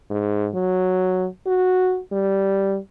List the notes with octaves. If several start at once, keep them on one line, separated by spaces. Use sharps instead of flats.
G#2
F#3
F#4
G3